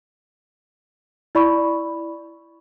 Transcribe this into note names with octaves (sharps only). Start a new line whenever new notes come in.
E4 D5 B5 C#6